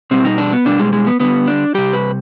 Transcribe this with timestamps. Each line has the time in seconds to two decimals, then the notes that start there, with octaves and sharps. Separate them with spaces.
0.11 B2 G3 C4
0.25 D#4
0.38 D4
0.53 B3
0.65 B2 G3 D4
0.79 G#3
0.93 G#3
1.06 B3
1.20 D3 G3 B3
1.47 D4
1.74 C3 G3 G4
1.93 B4